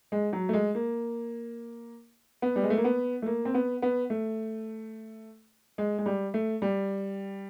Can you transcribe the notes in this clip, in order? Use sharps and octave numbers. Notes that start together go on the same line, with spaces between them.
G#3
F#3
A3
G#3
A#3
B3
G3
G#3
A3
A#3
B3
A3
A#3
C4
B3
B3
A3
G#3
G#3
G3
A3
G3